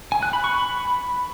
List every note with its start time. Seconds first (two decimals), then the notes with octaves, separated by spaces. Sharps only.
0.12 G#5
0.23 F#6
0.33 B5
0.44 C#6
0.55 B5